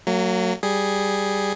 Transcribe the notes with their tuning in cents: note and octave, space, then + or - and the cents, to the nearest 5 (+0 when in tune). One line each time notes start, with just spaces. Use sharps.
F#3 +0 A#3 -40
G3 +0 G#4 +0